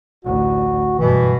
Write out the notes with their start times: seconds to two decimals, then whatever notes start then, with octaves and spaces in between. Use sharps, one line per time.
0.25 A1 D2 F#4
0.99 F#1 G2 B2 E3